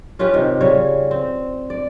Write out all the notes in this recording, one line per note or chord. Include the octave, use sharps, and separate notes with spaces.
C#4 F4 G4 B4
C3 D#3
C#3 G3 C#5
C4
D5